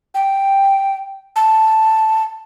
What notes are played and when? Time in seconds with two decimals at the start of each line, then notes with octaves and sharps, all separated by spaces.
0.14 G5
1.36 A5